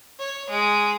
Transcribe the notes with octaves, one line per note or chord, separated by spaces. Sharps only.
C#5
G#3